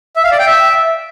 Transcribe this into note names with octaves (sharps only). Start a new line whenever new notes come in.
E5
F5
D5
G5
E5